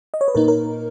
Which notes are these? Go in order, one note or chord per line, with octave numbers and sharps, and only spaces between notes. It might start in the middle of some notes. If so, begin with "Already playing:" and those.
D#5
C#5
B4
A#2 A#3 D#4 A#4
A#4